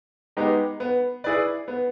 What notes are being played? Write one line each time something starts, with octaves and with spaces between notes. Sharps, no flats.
G#3 B3 D#4 G4
B3
E4 G#4 B4 D5
B3